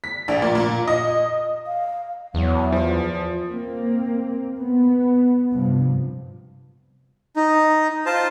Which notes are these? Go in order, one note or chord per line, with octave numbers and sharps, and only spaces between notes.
B6
A#1
A#2
A#2
D#5
F5
E2 F#3
F3 F4
A#3 C4
B3
G2 C3 F3
D#4
F4 C5 A5